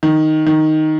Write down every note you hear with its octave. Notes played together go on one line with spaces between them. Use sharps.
D#3
D#3